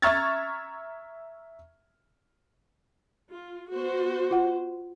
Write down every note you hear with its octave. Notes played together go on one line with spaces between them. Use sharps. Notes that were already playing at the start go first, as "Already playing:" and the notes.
E5 A#5 C#6 F6 G#6 A6
F4
B3 F#4 C5
F4 F#5